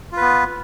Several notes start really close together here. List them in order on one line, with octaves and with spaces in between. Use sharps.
F4 B4 B3